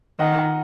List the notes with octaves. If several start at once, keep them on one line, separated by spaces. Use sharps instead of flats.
D#3 D#5 F#5
F#5 A#5